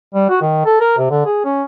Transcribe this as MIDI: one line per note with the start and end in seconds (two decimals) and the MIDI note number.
0.14 0.26 55
0.30 0.39 66
0.41 0.62 51
0.66 0.78 69
0.81 0.96 70
0.98 1.09 48
1.10 1.25 50
1.26 1.43 68
1.44 1.63 61